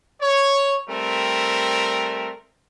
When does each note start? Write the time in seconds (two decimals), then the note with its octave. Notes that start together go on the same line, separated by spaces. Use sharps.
0.21 C#5
0.89 G3 A3 C4 A#4